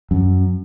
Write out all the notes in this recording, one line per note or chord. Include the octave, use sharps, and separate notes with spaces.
F#2